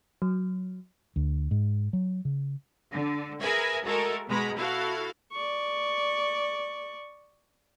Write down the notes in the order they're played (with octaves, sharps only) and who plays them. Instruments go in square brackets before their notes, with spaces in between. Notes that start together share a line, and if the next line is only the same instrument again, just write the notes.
[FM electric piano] F#3
[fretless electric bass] D2
G#2
F#3
C#3
[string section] D3
G#4 A#4 B4 E5 G#5
G#3 A3 F#4 A4 A#4
B2 G#3 A#5 B5
E4 F#4 A4 F5
[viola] D5 C#6